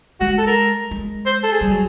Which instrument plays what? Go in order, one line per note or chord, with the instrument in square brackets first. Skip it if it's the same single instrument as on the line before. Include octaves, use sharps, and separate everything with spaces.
[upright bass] G#3 [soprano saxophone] F#4
[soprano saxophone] A4
A#4
[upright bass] G#3
[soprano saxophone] C5
A4
G#4
[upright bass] G3
F#3